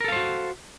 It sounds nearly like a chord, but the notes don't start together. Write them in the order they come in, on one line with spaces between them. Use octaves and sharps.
A#4 A4 F5 C5 F#4